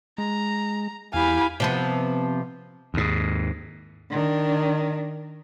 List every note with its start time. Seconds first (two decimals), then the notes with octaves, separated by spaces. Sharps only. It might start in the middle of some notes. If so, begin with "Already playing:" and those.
0.18 G#3 A#5
1.14 E2 E4 G4 F5 G#5 B5
1.60 C3 F3 B3
2.94 D#2 G#2
4.10 D#3 D4